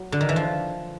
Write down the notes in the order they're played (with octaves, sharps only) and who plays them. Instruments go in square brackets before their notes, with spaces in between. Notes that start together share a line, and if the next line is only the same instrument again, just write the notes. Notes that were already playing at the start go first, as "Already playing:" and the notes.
Already playing: [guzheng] F#3
D3
D#3
E3
F3